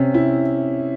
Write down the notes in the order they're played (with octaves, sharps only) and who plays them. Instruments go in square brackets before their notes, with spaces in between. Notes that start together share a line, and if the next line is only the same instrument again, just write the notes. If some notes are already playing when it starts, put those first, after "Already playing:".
Already playing: [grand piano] C3 C#4
E4